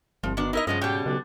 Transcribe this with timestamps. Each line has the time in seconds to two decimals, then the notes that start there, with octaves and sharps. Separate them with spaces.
0.23 G1 C2 F3
0.37 B2 D#3 D4
0.53 D#4 E4 A#4 D#5
0.67 G2 C#3 F3 G#3 B3 D#5
0.81 G#2 B2 G3 G5
1.06 B1 C#3 D4